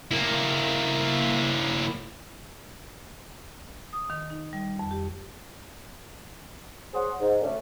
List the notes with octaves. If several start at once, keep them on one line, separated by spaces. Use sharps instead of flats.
A#3 E4
D#6
D#3
D#4
G3
F2
G4
G#4 C5 C#5 F#5 C6 D#6
G#2
D2 D3 A3 C#4 D4